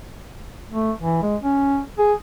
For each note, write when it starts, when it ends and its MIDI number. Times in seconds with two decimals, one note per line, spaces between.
0.71 0.91 57
1.02 1.21 52
1.22 1.36 56
1.43 1.79 61
1.99 2.14 68